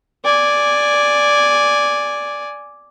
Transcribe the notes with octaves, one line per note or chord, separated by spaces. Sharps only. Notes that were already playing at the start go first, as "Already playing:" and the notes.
D5 G#5